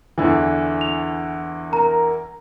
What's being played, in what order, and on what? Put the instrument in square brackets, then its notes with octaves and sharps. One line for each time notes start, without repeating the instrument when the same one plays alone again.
[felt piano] E2 D3 E3
[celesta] F7
[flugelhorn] A#4 [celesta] A#5